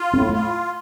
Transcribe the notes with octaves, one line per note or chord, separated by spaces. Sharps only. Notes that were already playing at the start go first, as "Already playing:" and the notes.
Already playing: F4
A2 C4
A#3
A3
F4